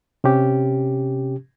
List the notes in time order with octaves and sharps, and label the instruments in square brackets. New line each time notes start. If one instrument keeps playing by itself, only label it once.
[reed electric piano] C3 C#4 G4